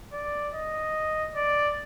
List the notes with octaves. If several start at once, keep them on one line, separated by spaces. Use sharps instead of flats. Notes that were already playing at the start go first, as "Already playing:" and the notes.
D5
D#5
D5